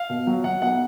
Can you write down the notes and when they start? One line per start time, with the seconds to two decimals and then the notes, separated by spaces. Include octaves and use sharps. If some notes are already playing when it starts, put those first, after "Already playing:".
Already playing: F5
0.09 B2
0.27 F#3
0.44 F#3 F#5
0.62 B1 F#5